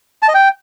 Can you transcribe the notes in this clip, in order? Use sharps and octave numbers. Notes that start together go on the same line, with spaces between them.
A5
D#5
G5